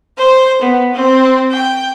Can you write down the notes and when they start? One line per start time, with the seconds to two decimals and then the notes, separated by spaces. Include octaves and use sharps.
0.17 C5
0.61 B3
0.93 C4
1.51 G5